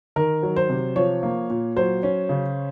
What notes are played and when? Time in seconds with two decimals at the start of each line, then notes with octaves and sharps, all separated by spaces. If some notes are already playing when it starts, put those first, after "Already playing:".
0.16 D#3 A#4
0.43 F#3
0.56 C5
0.70 C3
0.96 F3 C#5
1.23 A#3
1.50 A#2
1.76 F#3 C5
2.03 C#4
2.29 C#3